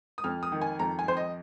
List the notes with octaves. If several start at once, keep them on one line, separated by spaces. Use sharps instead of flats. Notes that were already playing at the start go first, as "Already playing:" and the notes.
D#6
F2 F6
D#6
D#3
G#5
F2 A#5
G#5
F2 C5
D#5